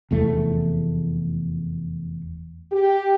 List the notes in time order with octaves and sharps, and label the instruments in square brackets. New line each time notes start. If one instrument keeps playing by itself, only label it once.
[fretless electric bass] F1 E2 A3
[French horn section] G4